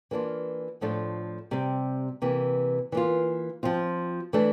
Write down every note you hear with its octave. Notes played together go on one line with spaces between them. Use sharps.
E3 A#3 D4 F4
A2 F3 A3 D4 F4
C3 G3 C4
C3 E3 A#3
E3 A#3 F4
F3 C4 F4
E3 A3 D4